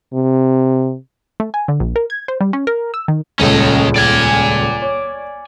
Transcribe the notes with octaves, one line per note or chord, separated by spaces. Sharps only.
C3
A3
G#5
D3
A#1
A#4
G#6
C5
G3
C#4
A#4
E6
D#3
D#1 C#2 C#4 A4 D#5
D5 G#5
C#5